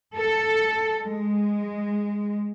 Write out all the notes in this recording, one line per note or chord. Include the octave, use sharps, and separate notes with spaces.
A4
G#3